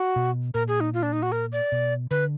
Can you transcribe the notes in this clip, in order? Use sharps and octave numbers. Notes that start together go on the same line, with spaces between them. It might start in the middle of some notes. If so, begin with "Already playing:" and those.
Already playing: F#4
B2
A#2 A#4
G#4
D#4
F4
D4
D#4
F#4
A#4
D5
B2
D3 B4